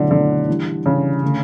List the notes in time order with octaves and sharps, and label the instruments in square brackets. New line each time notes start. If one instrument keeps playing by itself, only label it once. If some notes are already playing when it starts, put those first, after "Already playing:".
Already playing: [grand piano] B2 F#3 A3 E4 [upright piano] D3
[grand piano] B2 F#3 A3 E4 [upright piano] D3
[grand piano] E3 G3 D4
[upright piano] C#3 [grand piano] E3 G3 D4
[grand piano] D3 A3